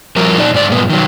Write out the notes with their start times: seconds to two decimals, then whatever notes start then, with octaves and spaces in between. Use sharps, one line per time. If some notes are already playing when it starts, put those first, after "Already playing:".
0.16 F3 G3 F#4 A#4
0.37 A#2 D#4 D5
0.54 G#2 D3 D5
0.70 G2 A#2 B3
0.90 D#3 F#3